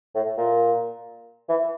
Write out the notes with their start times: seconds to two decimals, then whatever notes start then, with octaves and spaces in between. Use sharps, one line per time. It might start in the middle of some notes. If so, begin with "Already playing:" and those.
0.15 A2
0.38 A#2
1.49 E3